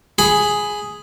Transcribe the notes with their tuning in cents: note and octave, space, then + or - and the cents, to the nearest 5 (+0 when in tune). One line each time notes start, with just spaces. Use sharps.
G#4 +0 B5 +15